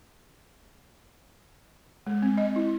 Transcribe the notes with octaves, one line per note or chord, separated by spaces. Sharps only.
G#3
C4
D#5
E4